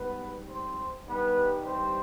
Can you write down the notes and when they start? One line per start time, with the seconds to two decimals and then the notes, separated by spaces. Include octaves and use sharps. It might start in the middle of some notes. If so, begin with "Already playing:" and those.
Already playing: G#2 G3 B3 B4
0.48 C4 C5
1.07 G2 D#3 G3 B3 B4
1.65 C4 C5